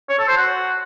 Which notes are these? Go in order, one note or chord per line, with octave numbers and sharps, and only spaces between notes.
C#5
A4
C5
F#4